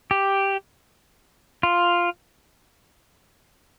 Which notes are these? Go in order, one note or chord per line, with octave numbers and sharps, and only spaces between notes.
G4
F4